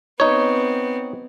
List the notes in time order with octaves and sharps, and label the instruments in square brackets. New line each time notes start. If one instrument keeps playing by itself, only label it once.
[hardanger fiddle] B3 C4 [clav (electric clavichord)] D#4 C#5